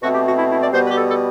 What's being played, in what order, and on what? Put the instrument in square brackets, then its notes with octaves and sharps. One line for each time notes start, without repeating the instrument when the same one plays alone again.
[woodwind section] B2 A3 C4 F#4
G4
F#4
E4
E4
D5
B2 G3 B3 C5
B4
G4
A4
A4